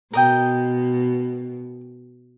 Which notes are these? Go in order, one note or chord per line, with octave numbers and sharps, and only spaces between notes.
B2 A#4 D#5 G5